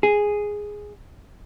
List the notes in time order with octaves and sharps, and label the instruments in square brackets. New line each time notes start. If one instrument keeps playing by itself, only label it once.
[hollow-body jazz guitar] G#4